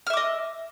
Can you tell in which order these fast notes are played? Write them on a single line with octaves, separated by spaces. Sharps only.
F6 E5 D6 D#5